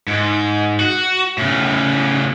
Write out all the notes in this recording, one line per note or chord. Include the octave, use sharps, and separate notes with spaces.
G#2
F#4
A2 C#3